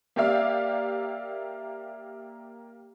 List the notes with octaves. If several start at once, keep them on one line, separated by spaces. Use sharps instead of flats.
A#3 G4 D5 E5 F5